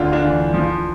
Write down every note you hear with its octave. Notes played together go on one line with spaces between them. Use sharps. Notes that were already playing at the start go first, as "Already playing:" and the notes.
Already playing: D2 D4 F4
D4 F4
E3
F3